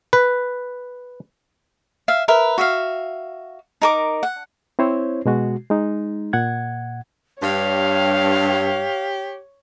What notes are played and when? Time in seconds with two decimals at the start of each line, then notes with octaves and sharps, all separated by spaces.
0.13 B4
2.08 E5 F5
2.28 A#4 B4 E5
2.58 F#4 E5 F5
3.82 D#4 A#4 D6
4.23 F#5
4.79 C4 E4 C5 C#5
5.26 B2 G#3 F#4
5.70 G#3 D#4
6.33 A#2 F#5 G#6
7.43 G2 G4 C#5 F5